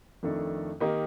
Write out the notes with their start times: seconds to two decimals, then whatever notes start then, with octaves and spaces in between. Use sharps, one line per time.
0.23 F2 D#3 A3 D4 A4
0.80 D#3 A#3 D#4 G4